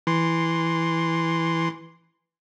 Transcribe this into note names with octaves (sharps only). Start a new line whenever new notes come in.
E3 C6